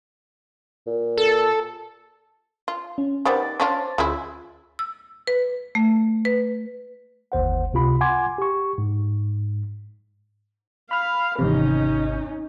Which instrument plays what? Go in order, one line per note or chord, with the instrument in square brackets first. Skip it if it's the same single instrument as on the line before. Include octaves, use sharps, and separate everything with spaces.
[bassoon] A#2
[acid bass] A4
[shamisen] F4
[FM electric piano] C#4
[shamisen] D#3 G3 B3 [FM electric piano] C5 D6 A6
[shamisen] C#4 D4 F4
[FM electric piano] D2 F4 E6 [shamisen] G#3 C#4 E4
[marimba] E6
B4
A3
B4
[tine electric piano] G1 D#2 C5 F#5
C#2 C3 F4 B5
F#5 G#5 C6 D6 G#6
G4 C#6
G#2
[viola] F5 [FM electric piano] B5 F6
[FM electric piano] G#1 E2 C3 [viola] C#4 D#4